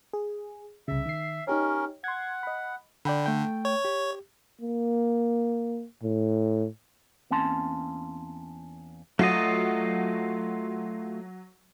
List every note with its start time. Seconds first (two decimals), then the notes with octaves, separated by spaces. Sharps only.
0.13 G#4
0.88 C2 C#3 E5
1.06 D#3 C7
1.47 C#4 D#4 G4 A#4 C#5
2.04 F#5 C6 G#6
2.43 D#5 B5
3.05 D3 D5 G5 B5
3.26 A3 G5
3.65 C#5
3.85 G4
4.62 A#3
6.03 A2
7.31 E2 A#3 C4 C#4 A5 C6
9.19 F#3 A3 F4 D#5